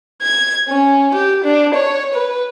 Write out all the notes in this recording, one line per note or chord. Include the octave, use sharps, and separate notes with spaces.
G#6
C#4
G4
D4
C#5
B4